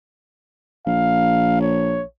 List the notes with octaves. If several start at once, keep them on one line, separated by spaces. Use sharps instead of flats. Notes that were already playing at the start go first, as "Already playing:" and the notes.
A#1 F5
C#5